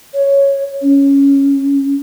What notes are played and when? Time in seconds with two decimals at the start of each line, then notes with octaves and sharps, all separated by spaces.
0.14 C#5
0.82 C#4